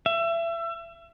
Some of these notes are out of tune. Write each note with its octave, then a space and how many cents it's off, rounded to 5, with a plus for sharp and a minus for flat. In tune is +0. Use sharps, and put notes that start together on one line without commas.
E5 +30